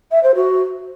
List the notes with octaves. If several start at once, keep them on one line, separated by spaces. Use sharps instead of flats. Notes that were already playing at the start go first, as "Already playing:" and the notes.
E5
C5
F#4